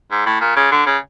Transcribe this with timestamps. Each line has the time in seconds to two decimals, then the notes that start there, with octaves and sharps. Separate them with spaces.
0.11 G#2
0.26 A2
0.41 A#2
0.56 C#3
0.72 D3
0.87 C#3